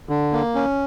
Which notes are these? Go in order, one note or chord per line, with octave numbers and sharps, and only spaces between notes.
D3
A#3
C#4